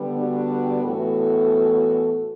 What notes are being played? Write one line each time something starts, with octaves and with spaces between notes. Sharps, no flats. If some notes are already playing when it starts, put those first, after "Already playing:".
Already playing: D3 G3 B3
D4 F#4
A2 E3 B3 F#4 A4